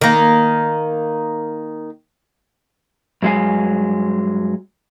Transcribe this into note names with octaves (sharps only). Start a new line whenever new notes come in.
D#3 A#3
G2 F#3 G#3 F5 G#5